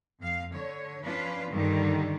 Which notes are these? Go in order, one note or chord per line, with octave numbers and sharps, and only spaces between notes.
F2 F5
D3 C#5
F3 C#4 D4 F4 B4
G2 D3 D#3 G3 D4